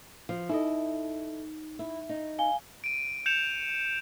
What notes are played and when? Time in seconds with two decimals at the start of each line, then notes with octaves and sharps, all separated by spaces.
0.29 F3
0.49 D#4 E4 A4 D#5
1.79 E4
2.09 D#4
2.38 F5 G#5 G7
2.84 D7 D#7
3.26 G6 C#7 E7 F7